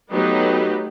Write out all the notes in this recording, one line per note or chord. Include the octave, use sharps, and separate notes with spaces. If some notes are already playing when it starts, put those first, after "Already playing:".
F#3 A3 B3 D#4 G4 B4